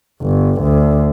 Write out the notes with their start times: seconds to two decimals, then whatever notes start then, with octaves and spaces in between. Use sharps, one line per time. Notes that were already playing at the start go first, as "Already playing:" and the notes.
0.22 G1
0.62 D2